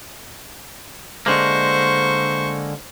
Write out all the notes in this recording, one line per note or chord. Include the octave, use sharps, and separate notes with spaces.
D3 G#3 A#3 C5 C#6